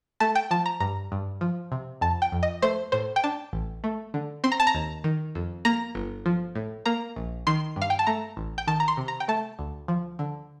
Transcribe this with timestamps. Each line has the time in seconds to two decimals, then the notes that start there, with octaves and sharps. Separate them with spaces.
0.20 A3 A5
0.35 G5
0.51 F3 A5
0.66 A#5
0.80 G2 A#5
1.12 G2
1.41 F3
1.72 C3
2.01 F2 A5
2.22 G5
2.32 F2
2.43 D#5
2.62 A3 C5
2.92 A2 C5
3.16 G5
3.24 D4 A5
3.53 A1
3.84 A3
4.14 D3
4.44 C4 C6
4.52 A#5
4.60 A5
4.67 A#5
4.75 D#2
5.04 D#3
5.35 F2
5.65 A#3 A#5
5.95 G1
6.26 F3
6.55 A2
6.86 A#3 A#5
7.16 A#1
7.47 D#3 C6
7.76 G2
7.82 F5
7.90 G5
7.99 A5
8.07 A3 A#5
8.37 A1
8.58 G5
8.67 D#3 A5
8.80 A#5
8.88 C6
8.97 C3
9.08 A#5
9.20 G5
9.28 A3 A5
9.59 D2
9.88 F3
10.19 D3